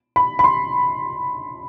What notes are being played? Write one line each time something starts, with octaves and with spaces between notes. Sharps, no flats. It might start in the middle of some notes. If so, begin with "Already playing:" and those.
B5
B5
C6